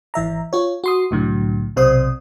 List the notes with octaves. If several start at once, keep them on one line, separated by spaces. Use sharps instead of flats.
G#1 E3 E5 A#5
F4 C#5
F#4 C6 D#6
C2 A2 D3 F#3
B1 C3 C5 C6 D#6